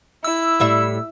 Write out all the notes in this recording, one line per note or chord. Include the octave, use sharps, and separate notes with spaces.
E4 E6
A2 G3 E5